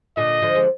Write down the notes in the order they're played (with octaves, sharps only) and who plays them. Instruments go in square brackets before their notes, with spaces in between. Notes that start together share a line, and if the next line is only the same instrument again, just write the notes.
[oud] A#2 D3 [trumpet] D#5
[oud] D3 F3
G#3